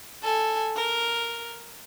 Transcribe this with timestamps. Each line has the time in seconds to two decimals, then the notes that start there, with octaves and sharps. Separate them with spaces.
0.23 A4 G#5
0.76 A#4